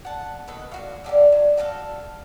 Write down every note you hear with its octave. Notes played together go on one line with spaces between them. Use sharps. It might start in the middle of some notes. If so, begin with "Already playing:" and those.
F#5 A5
B2 D#3 A4 B4
A#2 F#4 F5
A2 D3 G3 A#3
F#3
F#4 A4 D5 F5